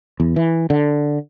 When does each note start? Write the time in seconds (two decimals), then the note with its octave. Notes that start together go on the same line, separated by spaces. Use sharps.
0.20 E2
0.36 E3
0.70 D3